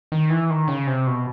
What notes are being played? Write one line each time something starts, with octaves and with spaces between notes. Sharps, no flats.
D#3
E3
D#3
C#3
C3
B2